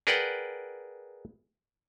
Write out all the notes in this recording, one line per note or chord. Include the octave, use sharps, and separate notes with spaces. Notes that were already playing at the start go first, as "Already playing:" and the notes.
G#4 A#4 B4 D5 F#5 G5